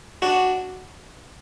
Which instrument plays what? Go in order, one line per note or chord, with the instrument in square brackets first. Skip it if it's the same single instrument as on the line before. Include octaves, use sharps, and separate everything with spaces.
[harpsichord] D4 F#4